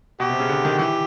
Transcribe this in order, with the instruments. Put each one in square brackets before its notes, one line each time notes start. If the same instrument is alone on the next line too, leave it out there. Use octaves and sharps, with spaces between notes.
[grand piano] B2 [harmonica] G4
[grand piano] C3
C#3
D3
D#3
[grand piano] E3 [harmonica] G4